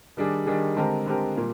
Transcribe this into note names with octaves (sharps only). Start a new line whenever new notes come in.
D#3 G3 D4 G#4
D#3 G3 D4 G#4
D3 G#3 C4 G4 A#4
D3 G#3 C4 G4 A#4
A#2 G3 A#3